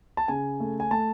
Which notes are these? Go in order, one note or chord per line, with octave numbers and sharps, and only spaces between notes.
A5
C#3 G#5
A3
G#5
A3 A5